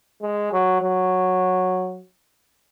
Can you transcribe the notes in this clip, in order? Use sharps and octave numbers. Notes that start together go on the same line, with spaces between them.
G#3
F#3
F#3